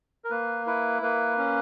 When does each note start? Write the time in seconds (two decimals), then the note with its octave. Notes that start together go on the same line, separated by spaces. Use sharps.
0.25 A#4
0.30 A#3 B4
0.66 E4 B4
1.02 A#3 B4
1.38 C#4